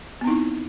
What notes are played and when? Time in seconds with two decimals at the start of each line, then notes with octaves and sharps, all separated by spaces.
0.21 B3
0.24 C4
0.27 D#4
0.30 E4